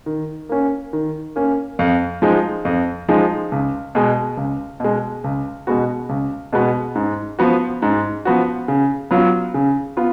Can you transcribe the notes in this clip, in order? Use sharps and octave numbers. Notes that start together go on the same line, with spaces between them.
D#3
A#3 C#4
D#3
A#3 C#4
F2
F3 G#3 D#4
F2
F3 G#3 D#4
C#2
B2 G#3
C#2
B2 G#3
C#2
B2 G#3 B3 F#4
C#2
B2 G#3 B3 F#4
G#2
F3 B3 F#4
G#2
F3 B3 F#4
C#3
F#3 B3 F4
C#3
B3 F4